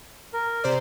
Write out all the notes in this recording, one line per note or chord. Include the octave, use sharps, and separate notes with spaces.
A#4
C3 C5 D5